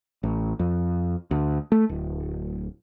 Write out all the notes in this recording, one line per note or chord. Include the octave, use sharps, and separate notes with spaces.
A1
F2
D2
A3
D1